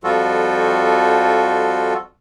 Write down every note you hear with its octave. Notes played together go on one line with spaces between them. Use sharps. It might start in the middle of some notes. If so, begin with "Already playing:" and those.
F2 F3 G3 F4 F#4 A4